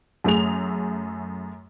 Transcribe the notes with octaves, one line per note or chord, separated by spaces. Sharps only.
F#2 A3 G#4 F7